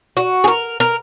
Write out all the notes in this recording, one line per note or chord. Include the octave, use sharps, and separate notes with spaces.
F#4
G#4
A#4
A#4